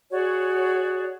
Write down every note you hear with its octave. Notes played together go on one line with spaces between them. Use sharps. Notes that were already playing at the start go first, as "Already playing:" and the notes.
F#4 G#4 C#5 D5